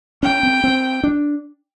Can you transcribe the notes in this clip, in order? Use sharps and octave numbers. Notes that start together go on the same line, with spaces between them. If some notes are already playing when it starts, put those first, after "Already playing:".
C#4 G5
C4
C4
D4